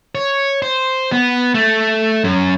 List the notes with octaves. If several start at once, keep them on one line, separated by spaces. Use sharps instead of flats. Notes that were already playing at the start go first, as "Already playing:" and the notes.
C#5
C5
B3
A3
F#2